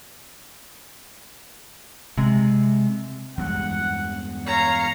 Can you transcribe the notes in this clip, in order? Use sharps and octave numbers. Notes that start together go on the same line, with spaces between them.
C3 G#3
E2 G2 G#3 F#5
C#5 F5 A#5